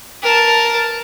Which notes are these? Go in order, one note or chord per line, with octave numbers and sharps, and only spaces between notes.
A#4 A5